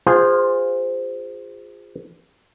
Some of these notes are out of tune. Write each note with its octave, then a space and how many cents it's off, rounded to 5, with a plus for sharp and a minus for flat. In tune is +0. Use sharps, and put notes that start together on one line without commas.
F4 +10 G#4 -25 C5 -15